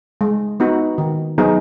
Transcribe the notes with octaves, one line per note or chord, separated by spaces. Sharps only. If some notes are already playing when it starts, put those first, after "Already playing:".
G#3
B3 D#4 F#4
D#3
F#3 B3 D#4 G#4